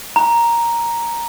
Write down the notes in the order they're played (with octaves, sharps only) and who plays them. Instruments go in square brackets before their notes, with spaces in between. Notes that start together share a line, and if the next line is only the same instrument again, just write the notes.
[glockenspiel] A#5